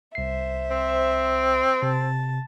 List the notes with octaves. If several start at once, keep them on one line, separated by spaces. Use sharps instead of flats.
C2 C5 E5 C7
C4
C3 A5